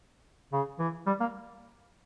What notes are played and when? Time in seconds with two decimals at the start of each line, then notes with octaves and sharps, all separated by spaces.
0.53 C#3
0.79 E3
1.07 G3
1.20 A#3